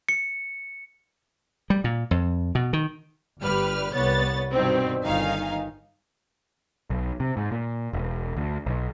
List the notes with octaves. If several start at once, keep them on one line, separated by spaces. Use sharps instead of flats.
C#7
G3
A#2
F2
B2
D#3
G1 G3 B4 F6
C2 B3 C#5 A6
G2 B2 D#3 C4
G1 D#3 D#4 F5 G#5
B1
C3
G#2
A#2
E1
D2
B1